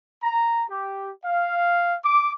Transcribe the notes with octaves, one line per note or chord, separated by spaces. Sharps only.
A#5
G4
F5
D6